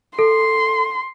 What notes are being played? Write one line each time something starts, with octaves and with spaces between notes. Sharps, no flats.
A4 C6